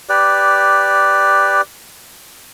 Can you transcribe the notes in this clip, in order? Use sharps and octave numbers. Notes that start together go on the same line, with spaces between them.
G4 B4 D5